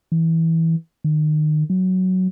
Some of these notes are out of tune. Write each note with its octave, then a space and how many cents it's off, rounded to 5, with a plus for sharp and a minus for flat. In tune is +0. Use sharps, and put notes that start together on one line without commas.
E3 -15
D#3 -30
F#3 +5